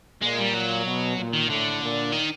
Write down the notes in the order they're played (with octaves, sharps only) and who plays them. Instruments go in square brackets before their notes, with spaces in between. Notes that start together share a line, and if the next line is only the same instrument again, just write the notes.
[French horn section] A#2 [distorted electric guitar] G#3
[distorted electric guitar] G3
F#3
[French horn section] B2
A#2
[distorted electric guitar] D#3
[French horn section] A2 [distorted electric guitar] D3
[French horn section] A#2
[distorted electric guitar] D#3